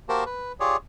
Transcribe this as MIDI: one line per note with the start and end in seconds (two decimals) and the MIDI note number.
0.09 0.24 58
0.09 0.24 66
0.09 0.24 67
0.09 0.24 70
0.09 0.24 72
0.09 0.24 81
0.26 0.52 71
0.60 0.77 65
0.60 0.77 67
0.60 0.77 68
0.60 0.77 73
0.60 0.77 74